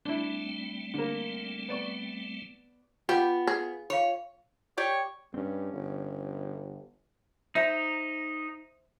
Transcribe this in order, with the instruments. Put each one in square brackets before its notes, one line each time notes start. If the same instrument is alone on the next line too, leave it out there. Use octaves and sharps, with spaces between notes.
[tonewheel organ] G3 A3 C4 [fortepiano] D4 E4
[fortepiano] D3 A#3
B3 D5 C#6
[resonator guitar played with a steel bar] B3 [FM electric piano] F4 [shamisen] G4
[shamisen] G#4
[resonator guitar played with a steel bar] C#5 [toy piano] F5 B5
[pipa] G4 D5 G5 [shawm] C#5
[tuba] G2 [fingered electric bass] C4 C#4
[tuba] G1
[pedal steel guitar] D#4 A#5 [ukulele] C5 E5